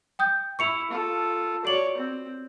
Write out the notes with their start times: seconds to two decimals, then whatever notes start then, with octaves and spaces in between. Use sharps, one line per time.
0.19 G5 D#6 G6
0.59 E4 C#6 C#7 F7
0.90 F4 A4
1.65 F#4 C#5 D5 F#7
1.97 C4